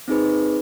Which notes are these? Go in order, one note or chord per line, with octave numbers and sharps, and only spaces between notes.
C4 D#4 G#4 B4